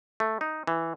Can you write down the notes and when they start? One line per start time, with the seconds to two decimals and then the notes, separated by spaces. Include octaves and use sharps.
0.20 A3
0.41 D#4
0.67 E3